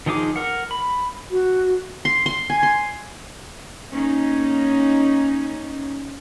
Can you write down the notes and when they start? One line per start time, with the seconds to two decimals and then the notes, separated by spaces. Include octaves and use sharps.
0.06 D#3 F3 D#4 G#4 D6
0.36 A#4 F#5
0.71 B5
1.31 F#4
2.05 C6
2.26 C6
2.50 G#5
2.63 C6
3.91 A#3 C#4 D#4